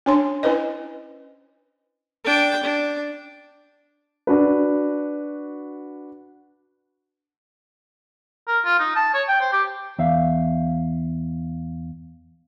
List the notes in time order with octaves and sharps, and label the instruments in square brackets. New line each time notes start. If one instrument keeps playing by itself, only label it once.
[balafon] C#4 D4 C#5 A5 C6
C#4 E4 B4 C5 D#5
[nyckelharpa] D4 G5
D4
[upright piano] D4 F#4 B4
[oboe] A#4
F4
D#4
A5
C#5
G5
C5
G4
[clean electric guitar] E2 E5 F5